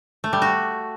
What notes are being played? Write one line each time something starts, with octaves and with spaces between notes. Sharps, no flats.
A3
G3
F#4